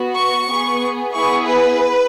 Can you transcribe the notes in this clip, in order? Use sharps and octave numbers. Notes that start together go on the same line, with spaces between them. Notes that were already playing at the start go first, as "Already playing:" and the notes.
Already playing: B3 F#4
C#6
B3 G#4
B3 E4 G#4 C#6
B4